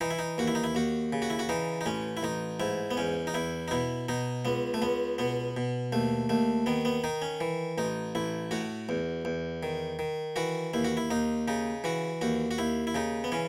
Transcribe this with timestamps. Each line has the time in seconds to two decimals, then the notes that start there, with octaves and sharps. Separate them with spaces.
0.01 E3 D#4
0.11 E4
0.19 D#4
0.38 D#2 F#4
0.47 E4
0.55 D#4
0.64 E4
0.75 D#2 F#4
1.13 C#3
1.22 F#4
1.30 E4
1.39 F#4
1.49 E3 D#4
1.81 D#4
1.86 A1 C#4
2.17 E4
2.23 A1 D#4
2.60 G#2 E4
2.91 B3
2.97 E2 C#4
3.27 D#4
3.34 E2 E4
3.68 D#4
3.71 B2 E4
4.09 B2 D#4
4.45 C#2 B3
4.74 A3
4.82 C#2 B3
5.18 B2 B3
5.57 B2
5.92 D#2 A3
6.29 D#2 A3
6.66 D#3 B3
6.85 B3
7.04 D#3 D#4
7.22 C#4
7.41 E3
7.78 A1 D#4
8.15 A1 E4
8.51 A2 F#4
8.89 E2
9.25 E2
9.63 D#3
9.99 D#3
10.36 E3 F#4
10.74 D#2 E4
10.84 F#4
10.97 E4
11.10 D#2 D#4
11.48 C#3 D#4
11.84 E3 F#4
12.21 D#2 F#4
12.51 F#4
12.58 D#2 E4
12.87 E4
12.95 C#3 D#4
13.24 B3
13.32 E3 C#4